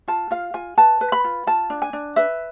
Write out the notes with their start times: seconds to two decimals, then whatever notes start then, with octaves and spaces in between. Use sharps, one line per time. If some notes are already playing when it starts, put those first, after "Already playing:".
0.08 F4 A5
0.31 F4 F5
0.54 F4 G#5
0.78 B4 A5
1.01 B4
1.12 B5
1.24 F4
1.47 F4 A5
1.70 D4
1.82 G#5
1.93 D4
2.16 B4 E5